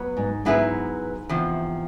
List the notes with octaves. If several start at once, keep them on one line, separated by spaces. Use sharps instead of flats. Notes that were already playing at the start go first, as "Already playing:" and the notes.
Already playing: F#3 B3 B4
G#2
G#2 F#3 B3 E4 G#4 B4
E2 C3 F3